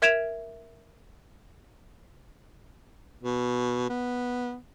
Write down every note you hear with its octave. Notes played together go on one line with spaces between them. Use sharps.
A#4 E5 G#6 D7 E7 F7
B2
B3